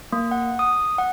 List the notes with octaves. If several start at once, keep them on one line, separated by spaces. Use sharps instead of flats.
A#3
F#5
D#6
F#5